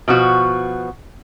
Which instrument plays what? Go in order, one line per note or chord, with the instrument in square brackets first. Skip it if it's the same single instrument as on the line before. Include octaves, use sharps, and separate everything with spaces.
[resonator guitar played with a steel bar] B2 F3 F#4